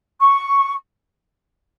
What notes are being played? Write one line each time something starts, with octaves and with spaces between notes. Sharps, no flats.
C#6